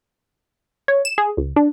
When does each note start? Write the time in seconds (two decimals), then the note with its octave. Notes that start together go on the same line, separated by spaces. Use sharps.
0.88 C#5
1.05 E7
1.18 G#4
1.37 C#2
1.56 D4